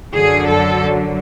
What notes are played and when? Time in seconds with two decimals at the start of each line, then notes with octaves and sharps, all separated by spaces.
0.14 F#2 D3 F#3 G#4
0.47 A4